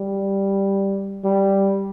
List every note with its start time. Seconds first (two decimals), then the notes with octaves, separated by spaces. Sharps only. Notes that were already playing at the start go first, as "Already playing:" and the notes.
Already playing: G3
1.24 G3